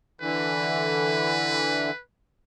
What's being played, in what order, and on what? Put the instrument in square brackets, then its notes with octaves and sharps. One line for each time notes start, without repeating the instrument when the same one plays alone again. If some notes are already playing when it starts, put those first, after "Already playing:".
[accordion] D3 E3 [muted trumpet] B4